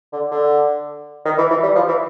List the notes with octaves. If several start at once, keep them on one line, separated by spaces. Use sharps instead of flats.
D3
D3
D#3
E3
E3
G3
F3
E3